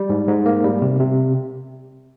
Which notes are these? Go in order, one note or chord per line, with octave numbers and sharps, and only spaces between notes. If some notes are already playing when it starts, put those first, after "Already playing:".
Already playing: G3
G#2
G#2
A#3
G3
C3
C3